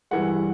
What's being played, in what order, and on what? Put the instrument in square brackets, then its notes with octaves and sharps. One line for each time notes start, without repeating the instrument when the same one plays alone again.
[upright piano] G2 E3 G#3 F#5